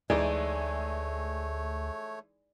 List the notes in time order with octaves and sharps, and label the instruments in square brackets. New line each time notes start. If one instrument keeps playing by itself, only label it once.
[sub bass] D2 [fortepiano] E3 G#3 D#4 [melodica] A3 C#5 [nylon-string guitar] D5